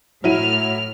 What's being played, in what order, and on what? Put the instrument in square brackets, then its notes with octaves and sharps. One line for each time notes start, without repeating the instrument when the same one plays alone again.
[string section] A2 F6 [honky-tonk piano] F#3 E4 D#7